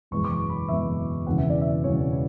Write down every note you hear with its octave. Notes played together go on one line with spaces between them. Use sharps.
F#1 E2 B2 G#3 C#6
D6
C#6
B5
F#1 E2 B2 G#3 E5
E1 E2 C#3 E3 F#5
E5
D5
E5
E1 E2 C#3 E3 C#5
E4